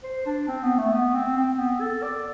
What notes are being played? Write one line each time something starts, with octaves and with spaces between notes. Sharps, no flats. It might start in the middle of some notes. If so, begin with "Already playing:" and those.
C5
D4
C4
B3
A3
B3
C4
C4
B3
A4
D5